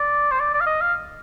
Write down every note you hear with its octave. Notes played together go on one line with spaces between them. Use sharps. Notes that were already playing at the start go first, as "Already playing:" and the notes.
Already playing: D5
C5
D5
D5
F5
D#5
F5